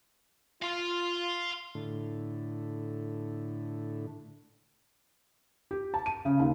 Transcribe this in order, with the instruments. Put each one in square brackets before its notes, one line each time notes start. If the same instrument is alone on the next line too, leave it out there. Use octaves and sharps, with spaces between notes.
[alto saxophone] F4 [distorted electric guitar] F5 C6
[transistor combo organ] A2 D3
[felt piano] G4
A5
D#7
C#3
D#2